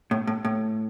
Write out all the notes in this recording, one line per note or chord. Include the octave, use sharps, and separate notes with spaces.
A2
A2
A2